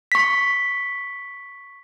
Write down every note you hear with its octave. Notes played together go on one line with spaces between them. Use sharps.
C#6 B6